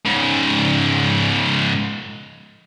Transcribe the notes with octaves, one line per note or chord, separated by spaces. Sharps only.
G#2 C#3